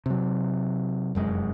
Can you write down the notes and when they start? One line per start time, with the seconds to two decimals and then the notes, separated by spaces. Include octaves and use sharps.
0.06 C3 F#3
1.15 F1 F#2 G#3